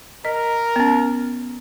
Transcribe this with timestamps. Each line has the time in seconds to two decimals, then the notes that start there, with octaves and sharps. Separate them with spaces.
0.25 A#4 D#5
0.76 B3 C#4